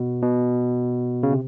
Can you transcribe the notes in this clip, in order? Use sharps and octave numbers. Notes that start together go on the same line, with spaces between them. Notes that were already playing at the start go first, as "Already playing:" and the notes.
Already playing: B2
B2
C#3
C3